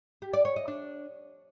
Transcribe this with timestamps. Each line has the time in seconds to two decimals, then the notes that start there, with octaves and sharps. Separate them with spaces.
0.22 G4
0.33 D5
0.45 C#5
0.56 D#5
0.68 D4